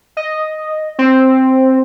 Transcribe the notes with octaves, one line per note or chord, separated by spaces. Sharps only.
D#5
C4